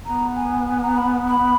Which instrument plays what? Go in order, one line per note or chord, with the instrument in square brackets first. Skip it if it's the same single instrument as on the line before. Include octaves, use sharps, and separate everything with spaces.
[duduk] B3 [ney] A#5
[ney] G#5
G#5
A#5
B5
B5